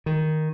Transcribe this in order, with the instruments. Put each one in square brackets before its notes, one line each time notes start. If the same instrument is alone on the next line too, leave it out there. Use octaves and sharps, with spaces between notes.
[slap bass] D#3